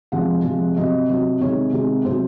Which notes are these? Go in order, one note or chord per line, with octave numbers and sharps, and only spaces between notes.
C3 F3 G#3 F#5
C3 F3 G#3
C3 F#3 D#5
C3 F#3
C3 D#3 G#3 C#5
C3 D#3 G#3
C3 F#3 C5